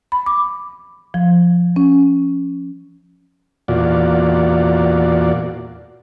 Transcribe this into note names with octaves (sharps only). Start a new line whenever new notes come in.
B5
D6
F3
C#4
E2 A#2 F4 F#4 D5